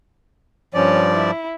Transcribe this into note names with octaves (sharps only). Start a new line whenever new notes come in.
G2 F3 C#4 D5
E4